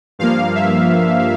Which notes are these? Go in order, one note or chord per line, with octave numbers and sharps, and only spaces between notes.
G2 F3 A#3 F5
E5